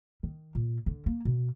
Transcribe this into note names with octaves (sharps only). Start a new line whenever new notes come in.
D#3
A#2
D3
A#3
B2